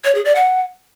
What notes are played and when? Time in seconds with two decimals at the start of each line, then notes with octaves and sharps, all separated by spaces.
0.04 C#5
0.15 G#4
0.25 D5
0.35 F#5